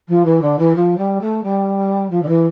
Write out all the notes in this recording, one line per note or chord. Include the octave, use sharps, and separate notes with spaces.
F3
E3
D3
E3
F3
G3
A3
G3
F3
D3
E3